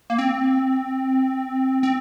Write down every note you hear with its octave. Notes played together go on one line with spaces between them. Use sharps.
A#3
C4
C4